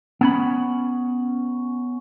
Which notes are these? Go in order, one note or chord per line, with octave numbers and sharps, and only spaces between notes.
B3 C#4 B5